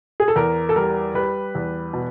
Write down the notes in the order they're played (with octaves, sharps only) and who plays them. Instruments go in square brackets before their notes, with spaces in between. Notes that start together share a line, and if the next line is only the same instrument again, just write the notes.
[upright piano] G#4
A4
E2 A#4
A4
G3 A#4
G3 B4
E2
B2